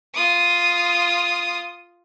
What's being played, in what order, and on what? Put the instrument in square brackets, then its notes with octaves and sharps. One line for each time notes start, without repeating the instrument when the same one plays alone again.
[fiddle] F4 D#6